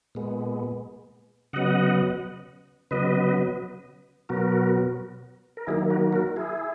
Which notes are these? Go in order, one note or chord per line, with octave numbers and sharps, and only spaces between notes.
A#2 G#3 B3
C#3 F#3 B3 D#5 F#5
C#3 F#3 B3 B4 D#5
B2 F#3 B3 F#4 A#4
A#4
D#3 F#3 A#3 E4 G#4
F#4 A#4
F#4 A#4
E4 G#4